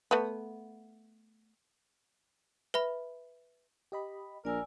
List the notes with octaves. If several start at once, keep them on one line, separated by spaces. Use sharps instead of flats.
A3 B3
B4 E5 B5
G4 D#5 B5
A#1 A#4 D5 G#5 E6